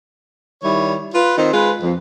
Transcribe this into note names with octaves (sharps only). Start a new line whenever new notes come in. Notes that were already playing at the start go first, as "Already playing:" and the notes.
D#3 G3 E4 C#5
F4 B4
D#3 C4
G#3 F4 B4
F2